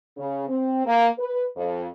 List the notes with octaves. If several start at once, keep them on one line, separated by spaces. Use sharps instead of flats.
C#3
C4
A#3
B4
F2